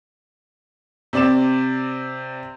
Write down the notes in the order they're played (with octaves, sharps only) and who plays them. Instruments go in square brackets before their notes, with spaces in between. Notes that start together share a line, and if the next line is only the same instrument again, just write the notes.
[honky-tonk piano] C3 C4 D5 D6 E7